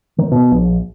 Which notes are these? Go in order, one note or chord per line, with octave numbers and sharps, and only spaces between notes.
D#3
B2
A#1